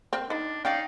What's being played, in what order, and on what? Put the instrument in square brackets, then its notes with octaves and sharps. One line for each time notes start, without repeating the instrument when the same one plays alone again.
[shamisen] C4 A#4
[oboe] D4 [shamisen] D#4 B5
[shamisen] C#4 [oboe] D#4 [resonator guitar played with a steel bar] D5 F5 G5